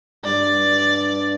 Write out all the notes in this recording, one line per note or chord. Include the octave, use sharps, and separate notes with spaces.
G2 D5